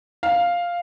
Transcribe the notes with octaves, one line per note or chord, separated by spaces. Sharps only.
F5